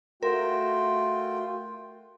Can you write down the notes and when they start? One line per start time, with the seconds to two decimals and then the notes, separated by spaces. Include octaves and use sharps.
0.23 A3 F4 F#4 A#4 G5